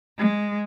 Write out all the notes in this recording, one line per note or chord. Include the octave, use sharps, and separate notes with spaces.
G#3